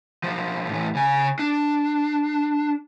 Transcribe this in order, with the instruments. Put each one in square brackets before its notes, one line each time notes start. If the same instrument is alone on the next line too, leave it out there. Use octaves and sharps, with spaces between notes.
[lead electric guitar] B1 F3
A2 E3
C#3 G#5
D4